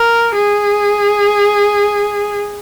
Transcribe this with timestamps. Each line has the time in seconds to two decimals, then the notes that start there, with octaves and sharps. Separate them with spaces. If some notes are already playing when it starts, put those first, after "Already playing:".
Already playing: A#4
0.34 G#4